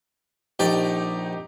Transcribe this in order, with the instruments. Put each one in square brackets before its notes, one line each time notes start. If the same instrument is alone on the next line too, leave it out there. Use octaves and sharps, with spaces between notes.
[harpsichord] A#1 D5 G5 [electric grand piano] D#4 G4